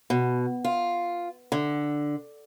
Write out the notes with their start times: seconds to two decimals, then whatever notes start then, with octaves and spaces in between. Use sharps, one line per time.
0.10 B2
0.65 F4
1.52 D3